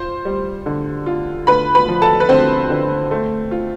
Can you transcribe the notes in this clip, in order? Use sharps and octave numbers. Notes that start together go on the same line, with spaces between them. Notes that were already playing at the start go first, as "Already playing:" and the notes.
Already playing: F4 C5 C6
G3
D3
F4
D3 B4 B5
B4 B5
F3
A4 A5
B4
D3 C4 C5
D3
A3
F4